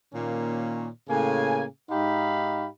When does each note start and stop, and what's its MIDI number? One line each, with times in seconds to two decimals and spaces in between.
0.14 0.89 46
0.14 0.89 51
0.14 0.89 58
0.14 0.89 61
1.09 1.64 45
1.09 1.64 49
1.09 1.64 58
1.09 1.64 80
1.91 2.67 44
1.91 2.67 63
1.91 2.67 67
1.91 2.67 77
1.91 2.67 83